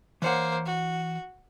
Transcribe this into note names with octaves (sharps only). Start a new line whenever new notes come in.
E3 A#3 C5 C#5 F#5
F#4